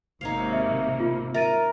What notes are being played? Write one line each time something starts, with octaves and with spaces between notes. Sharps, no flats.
G#1 C3 A#3 D#4 C#5 F5
E5
F4
A#4 E5 A6 D#7